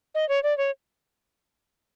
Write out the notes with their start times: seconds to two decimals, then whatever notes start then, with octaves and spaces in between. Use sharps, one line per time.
0.15 D#5
0.29 C#5
0.43 D5
0.58 C#5